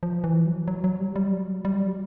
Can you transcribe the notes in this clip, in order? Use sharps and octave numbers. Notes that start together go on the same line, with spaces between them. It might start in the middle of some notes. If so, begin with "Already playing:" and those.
F3
E3
F#3
F#3
F#3
G3
G3
F#3
G3
F#3